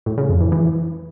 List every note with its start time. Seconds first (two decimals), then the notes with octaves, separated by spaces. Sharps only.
0.06 A2
0.18 C#3
0.29 F2
0.41 E3
0.52 E3